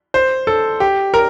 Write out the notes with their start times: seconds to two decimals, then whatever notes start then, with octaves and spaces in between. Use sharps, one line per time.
0.14 C5
0.47 A4
0.80 G4
1.14 A#4